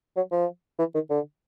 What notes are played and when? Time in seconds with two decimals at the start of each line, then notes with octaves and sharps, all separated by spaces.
0.17 F#3
0.32 F3
0.79 E3
0.94 D#3
1.10 D3